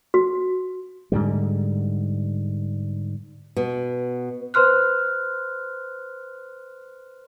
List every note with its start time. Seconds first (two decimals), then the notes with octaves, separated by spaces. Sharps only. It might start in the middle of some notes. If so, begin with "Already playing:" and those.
0.14 F#4
1.12 G#2 D3 G3
3.56 B2
4.54 B4 C5 C6 F6 F#6